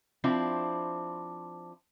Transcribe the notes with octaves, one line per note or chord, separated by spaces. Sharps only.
F3 C4 D4 E4